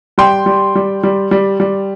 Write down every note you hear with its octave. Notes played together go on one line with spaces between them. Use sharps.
G3 G5 C6
G3
G3
G3
G3
G3